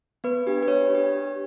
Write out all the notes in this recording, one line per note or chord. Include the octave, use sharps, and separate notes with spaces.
B3 B4
D4 G4
B4
B3 C#5
D4 G4